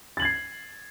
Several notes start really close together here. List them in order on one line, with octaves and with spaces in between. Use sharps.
A6 F#7 G#6 C7